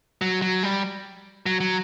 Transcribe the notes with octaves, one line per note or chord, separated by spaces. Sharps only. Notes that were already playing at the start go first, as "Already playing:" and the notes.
F#3
F#3
G3
F#3
F#3